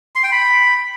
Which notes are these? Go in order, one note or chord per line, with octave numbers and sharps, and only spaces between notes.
C6
G5
B5